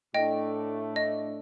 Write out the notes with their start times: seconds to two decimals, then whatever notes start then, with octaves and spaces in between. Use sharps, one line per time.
0.14 A2 A3 D4 D#5 G5
0.96 D#5